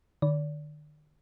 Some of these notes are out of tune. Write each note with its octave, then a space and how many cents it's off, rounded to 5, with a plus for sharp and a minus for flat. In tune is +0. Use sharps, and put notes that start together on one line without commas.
D3 +45 D5 -35